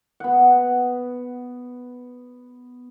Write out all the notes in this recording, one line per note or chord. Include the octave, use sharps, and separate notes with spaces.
B3 F#5